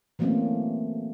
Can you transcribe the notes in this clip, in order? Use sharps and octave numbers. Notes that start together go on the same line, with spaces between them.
E3 F#3 A3 A#3 C4 C#4